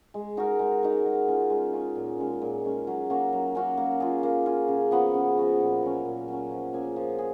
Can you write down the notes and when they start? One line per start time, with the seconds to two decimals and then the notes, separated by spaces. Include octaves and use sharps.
0.14 G#3
0.37 D#4 F#4 A#4
0.59 G#3
0.83 D#4 F#4 A#4
1.06 G#3
1.28 C#4 F4
1.50 G#3
1.73 C#4 F4
1.96 A#2
2.19 G#3 C#4
2.42 A#2
2.65 G#3 C#4
2.87 F#3
3.10 A#3 C#4 F#4
3.33 F#3
3.55 A#3 C#4 F#4
3.77 A#3
4.00 F4 G#4
4.23 A#3
4.46 F4 G#4
4.68 C#3
4.91 F3 B3 F#4
5.14 C#3
5.38 F3 B3 F#4
5.61 A#2
5.83 F#3 C#4
6.05 A#2
6.28 F#3 C#4
6.51 F3
6.73 A#3 C#4 G#4
6.96 F3
7.19 G#4